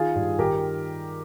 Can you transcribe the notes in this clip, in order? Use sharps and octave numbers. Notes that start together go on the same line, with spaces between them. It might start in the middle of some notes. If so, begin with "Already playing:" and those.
Already playing: D#3 F4 G#4
G2
D#3 G4 A#4